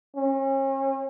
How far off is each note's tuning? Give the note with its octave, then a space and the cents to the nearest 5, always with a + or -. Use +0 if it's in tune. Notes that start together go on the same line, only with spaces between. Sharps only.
C#4 -40